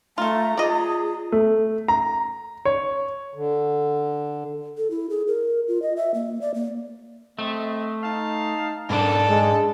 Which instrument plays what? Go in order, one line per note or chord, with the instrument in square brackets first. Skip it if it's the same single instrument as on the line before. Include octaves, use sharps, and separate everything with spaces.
[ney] A3 [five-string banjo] F4 A4 [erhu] A#5
[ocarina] F4 [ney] G#4 [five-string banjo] D5 D#5
[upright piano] A3
A#5
C#5
[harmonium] D3
[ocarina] A4
E4
G#4
A#4
F4
D#5
E5
A#3
D5
A#3
[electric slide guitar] A3 [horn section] C4 D#5
[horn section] D#4 F5 A5
[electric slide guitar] G#2 D4 [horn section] A#3 [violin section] A4
[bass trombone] G#3 [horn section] G#4